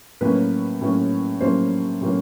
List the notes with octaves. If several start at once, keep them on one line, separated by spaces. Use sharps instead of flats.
A2 F#3 A#3 C#4 B4
A2 F#3 A#3 C#4
A2 F#3 A#3 C#4 C5
A2 F#3 A#3 C#4